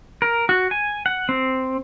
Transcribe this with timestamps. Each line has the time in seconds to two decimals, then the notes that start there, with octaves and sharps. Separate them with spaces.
0.22 A#4
0.49 F#4
0.71 G#5
1.06 F#5
1.29 C4